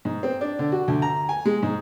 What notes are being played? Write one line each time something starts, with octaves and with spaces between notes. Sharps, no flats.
G#2
C4
D4
D3
F#4
D2
A#5
G#5
G#3
G#2